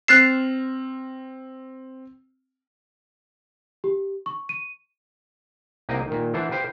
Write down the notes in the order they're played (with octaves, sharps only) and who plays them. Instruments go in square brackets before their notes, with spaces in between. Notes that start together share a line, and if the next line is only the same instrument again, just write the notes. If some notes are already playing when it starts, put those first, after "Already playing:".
[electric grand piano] C4 F6 E7 [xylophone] F#6 A6 C7
[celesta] G4
C#6
D#7
[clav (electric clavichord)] C2 C3 A#3 C4 D#5 G5
A#2 D#3
E3 D4 C5 D5 F#5 A5
G4 B4 C5 F5 G5